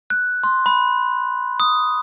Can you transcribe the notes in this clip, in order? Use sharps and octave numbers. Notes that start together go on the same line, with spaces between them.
F#6
C6
B5
D#6